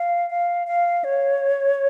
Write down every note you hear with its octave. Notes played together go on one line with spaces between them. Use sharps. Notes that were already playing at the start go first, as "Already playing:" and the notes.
Already playing: F5
F5
F5
C#5